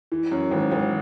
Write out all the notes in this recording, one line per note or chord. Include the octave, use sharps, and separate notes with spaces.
E3
F#2
G#1
G#1